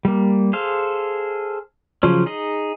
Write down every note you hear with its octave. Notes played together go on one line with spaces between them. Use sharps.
G3 A#3
G#4 A4 C5 F5
C#3 F3 F#3 C#4
D#4 G#4 D#5